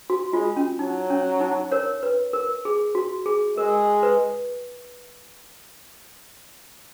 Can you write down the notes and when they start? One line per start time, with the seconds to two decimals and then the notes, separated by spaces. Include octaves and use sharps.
0.10 F#4
0.33 G#3 F4
0.57 C#4
0.79 F#3 D#4
1.10 C#4
1.41 D#4
1.72 A#4 C#5
2.03 B4
2.33 A#4
2.65 G#4
2.95 F#4
3.26 G#4
3.57 G#3 A#4
4.03 B4